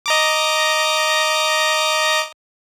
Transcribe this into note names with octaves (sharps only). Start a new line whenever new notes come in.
D#5 A#5 D6